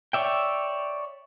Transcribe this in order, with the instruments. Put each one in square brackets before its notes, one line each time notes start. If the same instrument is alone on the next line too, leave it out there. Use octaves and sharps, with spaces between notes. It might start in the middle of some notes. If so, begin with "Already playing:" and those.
[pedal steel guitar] C#5 D5 E5 G5